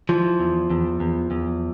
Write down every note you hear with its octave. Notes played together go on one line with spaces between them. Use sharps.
E3 F3
E2
E2
E2
E2